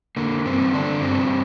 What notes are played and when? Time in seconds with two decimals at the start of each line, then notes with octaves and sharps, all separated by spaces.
0.17 D3 A#3
0.46 G2 C4
0.74 D3 D4
1.02 G2 C4